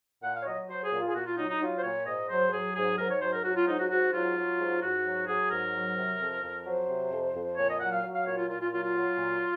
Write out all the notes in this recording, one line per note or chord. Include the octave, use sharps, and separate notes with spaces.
A#2 F#5
F5
C#5
F#3 D#5
F#3 C5
G#4
A#2
F4
G#4
A#2 F#4
F4
F#3 D#4
D#4
F#3 F4
C5
A#2 C#5
G#2 D#5
F#3 C5
F#3 G#4
G#2 G#4
G#2 A#4
C#5
F#3 C5
A#4
F#3 F#4
F4
G#2 D#4
F#4
G#2 F#4
F#3 F4
F#3
G#2
G#2 F#4
F#3
F#3 G#4
G#2 A#4
F#3
C3
F2
F2
F#3 C5
C3
F2
F2
A#2 C#5
D#5
F#3 F#5
F5
F#3
F5
A#2 C#5
F4
A#2 F4
F4
F#3 F4
F4
F#3
A#2